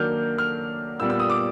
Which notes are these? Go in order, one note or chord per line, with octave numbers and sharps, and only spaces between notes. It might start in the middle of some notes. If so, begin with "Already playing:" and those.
Already playing: D#3 F#3 A#3 D4 F6 G6
F6
A#2 G3 B3 E6
E6
D#6
D6